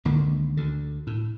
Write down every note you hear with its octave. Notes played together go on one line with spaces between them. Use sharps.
C#2 D3 D#3 A#3
D2 D3
A2